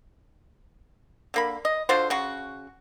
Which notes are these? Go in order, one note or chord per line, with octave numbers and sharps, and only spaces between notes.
D3 A#3 B5
D#5
D3 F4 F#4 C5
C#3 F#4